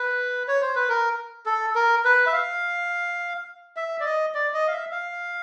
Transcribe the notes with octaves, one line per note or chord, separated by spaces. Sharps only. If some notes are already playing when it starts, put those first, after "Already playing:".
Already playing: B4
C#5
C5
B4
A#4
A4
A#4
B4
E5
F5
E5
D5
D#5
D5
D#5
F5
E5
F5